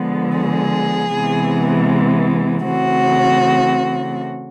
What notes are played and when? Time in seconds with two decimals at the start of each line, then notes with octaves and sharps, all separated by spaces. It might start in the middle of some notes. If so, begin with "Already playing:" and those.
Already playing: D3 F3 G#3 B3
0.39 G#4
1.15 C3 E3 G#3 B3
2.66 C#3 E3 A3 C4 F#4